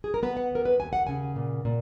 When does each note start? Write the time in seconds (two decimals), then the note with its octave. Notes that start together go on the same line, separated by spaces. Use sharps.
0.04 G#4
0.14 A#4
0.23 B3 B4
0.37 F#5
0.51 D#2 A#4
0.65 B4
0.80 D#2 G#5
0.93 F#5
1.07 C#3 G#5
1.36 A#2
1.65 A#2